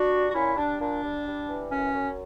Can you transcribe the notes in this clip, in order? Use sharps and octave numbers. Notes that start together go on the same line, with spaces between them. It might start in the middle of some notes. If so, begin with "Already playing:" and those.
Already playing: D4 F#4
G3
F#4
A#2 C#4 E4
G3 D4
A#2 D4
G3
G3
E3
F#2 C#4
F#2